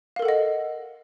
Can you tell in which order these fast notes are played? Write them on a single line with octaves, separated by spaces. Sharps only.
F5 A#4 A4 F#5 D#5